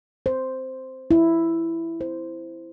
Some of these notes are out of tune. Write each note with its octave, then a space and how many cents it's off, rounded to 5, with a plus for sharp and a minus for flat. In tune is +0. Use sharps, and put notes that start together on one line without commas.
C5 -5
E4 +5
C5 -10